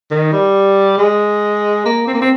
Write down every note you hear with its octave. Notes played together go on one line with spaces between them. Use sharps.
D#3
G3
G#3
A#3
C4
A#3
C4